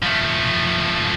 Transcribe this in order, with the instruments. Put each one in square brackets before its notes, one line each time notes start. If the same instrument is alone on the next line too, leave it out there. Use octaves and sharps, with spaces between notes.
[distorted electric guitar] F3 A3